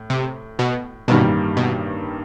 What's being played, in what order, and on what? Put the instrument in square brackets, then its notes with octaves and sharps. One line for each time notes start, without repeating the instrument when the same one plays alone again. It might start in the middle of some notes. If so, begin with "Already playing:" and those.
Already playing: [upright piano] A2
[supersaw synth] C3
B2
[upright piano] A1 G2 D#3 G3 A#3 [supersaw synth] B2
[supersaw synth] B2